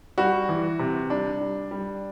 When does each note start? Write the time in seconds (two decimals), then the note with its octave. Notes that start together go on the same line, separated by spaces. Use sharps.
0.18 G3 F#4
0.49 E3
0.79 C3
1.10 G3 D4
1.41 G3
1.71 G3